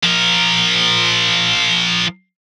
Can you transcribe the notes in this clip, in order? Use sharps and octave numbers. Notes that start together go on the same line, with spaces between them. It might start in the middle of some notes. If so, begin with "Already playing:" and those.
F3 A#4